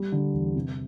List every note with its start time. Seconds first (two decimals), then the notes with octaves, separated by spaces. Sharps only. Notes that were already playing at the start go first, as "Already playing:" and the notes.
Already playing: G3
0.12 D3
0.33 E2
0.56 C3